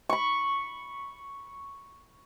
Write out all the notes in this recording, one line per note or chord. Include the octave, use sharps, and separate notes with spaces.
B5 C#6